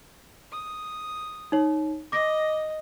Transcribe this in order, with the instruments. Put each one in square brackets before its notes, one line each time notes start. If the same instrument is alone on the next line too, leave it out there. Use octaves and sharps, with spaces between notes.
[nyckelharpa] D#6
[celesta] D#4 C#5
[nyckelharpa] D#5 [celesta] D6 A#6